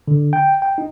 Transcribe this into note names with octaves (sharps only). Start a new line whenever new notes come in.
D3
G5
G5
D#4